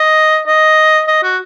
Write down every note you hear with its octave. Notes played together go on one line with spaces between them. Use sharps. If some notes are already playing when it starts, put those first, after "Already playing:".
Already playing: D#5
D#5
D#5
F#4